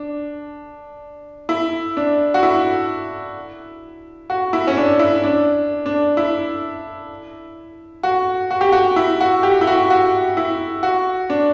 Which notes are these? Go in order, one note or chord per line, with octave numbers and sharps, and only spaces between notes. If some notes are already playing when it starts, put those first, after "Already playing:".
Already playing: D4
E4
D4
F#4
E4
F#4
E4
C#4
D4
E4
D4
D4
E4
F#4
F#4
G4
F#4
E4
F#4
G4
E4
F#4
F#4
E4
F#4
D4